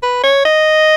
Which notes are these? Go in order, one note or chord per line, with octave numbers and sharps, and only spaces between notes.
B4
C#5
D#5